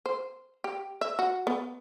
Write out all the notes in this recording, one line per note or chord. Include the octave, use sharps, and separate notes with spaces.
C5
G4
E5
F#4
B3